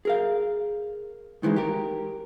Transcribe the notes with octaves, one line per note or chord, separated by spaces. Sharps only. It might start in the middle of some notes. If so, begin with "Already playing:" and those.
G#4 A#4 F5
G#2 D#3 E3 F#3 G#3
G4 A#4